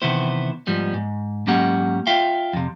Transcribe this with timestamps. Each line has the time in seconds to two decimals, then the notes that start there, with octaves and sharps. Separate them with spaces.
0.02 C3 D#3 E3 B3 E4 C5
0.67 G#2 F3 G3 B3
0.94 G#2
1.47 G#2 F#3 A#3 C#4 G4 F#5
2.07 F4 E5 F5 G5
2.53 F2 C3